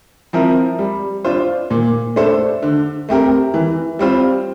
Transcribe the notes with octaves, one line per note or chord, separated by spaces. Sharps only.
F3 C4 E4 A#4
G3
D4 F4 C5
A#2
A3 D4 A4 C5
D3
A3 C4 G4 A#4
E3
G3 C4 F4 C5